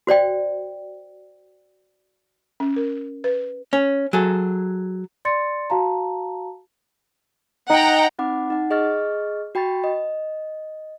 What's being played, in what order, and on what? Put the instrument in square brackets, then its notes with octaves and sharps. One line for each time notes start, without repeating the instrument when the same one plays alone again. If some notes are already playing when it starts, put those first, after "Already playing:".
[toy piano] F#4 C5 D5 G5
[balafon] C#4
A#4
B4
[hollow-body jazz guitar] C#4
F#3 G#4 A4
[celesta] D5 C6 A6 C#7
F#4 F5 A5 A#5
[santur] D#4 [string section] F#5 G5 A#5
[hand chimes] C4 D#4 F#5 B5 D6
D#4 F#5
G#4 D#5 C#6 F6 A6
F#4 G5 B5 C#6 A6
D#5